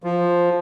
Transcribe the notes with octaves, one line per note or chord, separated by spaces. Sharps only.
F3